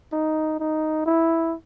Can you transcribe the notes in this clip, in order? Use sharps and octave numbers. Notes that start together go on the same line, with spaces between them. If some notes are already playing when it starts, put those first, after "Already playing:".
D#4
D#4
E4